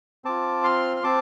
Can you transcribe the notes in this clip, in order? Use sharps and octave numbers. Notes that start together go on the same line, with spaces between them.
C4 F4 A5 D6
C6 F6
F6
C4 A5 D6